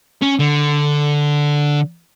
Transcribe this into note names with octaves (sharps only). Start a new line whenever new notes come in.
C#4
D3